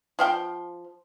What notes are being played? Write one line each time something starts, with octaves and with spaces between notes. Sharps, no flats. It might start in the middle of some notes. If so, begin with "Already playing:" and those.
F3 F5 G5